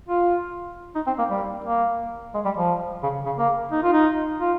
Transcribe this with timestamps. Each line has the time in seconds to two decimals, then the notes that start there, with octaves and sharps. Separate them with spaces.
0.09 F4
0.95 D#4
1.07 C4
1.18 A#3
1.30 G3
1.64 A#3
2.35 G#3
2.45 G3
2.57 F3
3.03 C#3
3.26 C#3
3.38 A#3
3.72 D#4
3.83 F4
3.93 D#4
4.41 F4